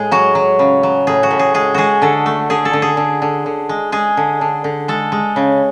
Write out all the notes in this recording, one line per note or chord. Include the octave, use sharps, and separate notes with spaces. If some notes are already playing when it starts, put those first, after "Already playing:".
Already playing: A2 G#3 G#4
F#3 F#4
F#3
C#3
F#3
A2 G#4
F#4
A2
G#4
G#3 G#4
G#3 F#4 G#4
D3 A4
A3
D3 G#4
A4
D3
G#4
D3
D3
D3
G#3
G#3 G#4
D3
D3
D3
G#3 A4
G#3
C#3